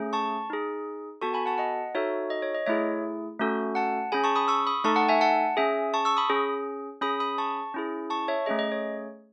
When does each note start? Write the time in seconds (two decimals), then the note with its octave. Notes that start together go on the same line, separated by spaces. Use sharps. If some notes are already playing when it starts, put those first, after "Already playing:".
Already playing: A3 C#4 G#4
0.13 A5 C#6
0.50 D#4 G#4
1.21 B3 F#4 A4 A5 C#6
1.34 G#5 B5
1.46 F#5 A5
1.58 D#5 F#5
1.95 D#4 F#4 A4 C#5 E5
2.30 D#5
2.42 C#5
2.55 D#5
2.66 A3 E4 G#4 C#5 E5
3.39 A3 C#4 F#4 A4
3.75 F#5 A5
4.12 C#4 G#4 G#5 B5
4.24 A5 C#6
4.36 B5 D#6
4.48 C#6 E6
4.67 B5 D#6
4.84 A3 D#4 A4 A5 C#6
4.96 F#5 A5
5.09 E5 G#5
5.21 F#5 A5
5.57 C#4 G#4 E5 G#5
5.94 A5 C#6
6.05 C#6 E6
6.17 B5 D#6
6.30 C#4 G#4
7.01 C#4 G#4 B5 D#6
7.20 B5 D#6
7.38 A5 C#6
7.74 C#4 E4 G#4
8.10 A5 C#6
8.28 C#5 E5
8.46 A3 C#4 G#4 D#5
8.59 D#5
8.72 C#5